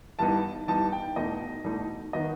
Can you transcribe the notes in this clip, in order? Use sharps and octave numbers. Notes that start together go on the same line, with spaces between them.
G2 E3 B3 D#4 A5
G2 E3 B3 D#4 A5
G5
E2 B2 A3 D#4 D#5
E2 B2 A3 D#4
D#3 F#3 B3 D#4 D#5